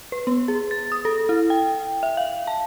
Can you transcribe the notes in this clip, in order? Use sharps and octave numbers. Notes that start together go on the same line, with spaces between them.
B4
B3
G#4
A6
D#6
A4
E4
G5
E5
F5
A5